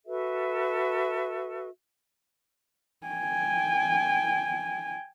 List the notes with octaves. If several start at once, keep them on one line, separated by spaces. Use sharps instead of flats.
F#4 A4 B4 E5
G5 G#5